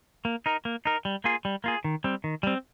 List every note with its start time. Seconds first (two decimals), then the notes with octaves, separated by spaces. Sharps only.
0.25 A#3
0.46 D#4 A#4
0.65 A#3
0.85 D#4 A#4
1.05 G3
1.24 A#3 F4 G#4
1.45 G3
1.64 A#3 F4 G#4
1.84 D#3
2.04 G3 C4
2.24 D#3
2.43 G3 C4